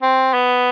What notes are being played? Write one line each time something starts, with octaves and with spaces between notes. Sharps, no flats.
C4
B3